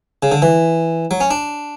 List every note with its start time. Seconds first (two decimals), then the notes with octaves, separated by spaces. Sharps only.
0.23 C#3
0.32 D3
0.42 E3
1.11 F#3
1.21 C#4
1.31 D4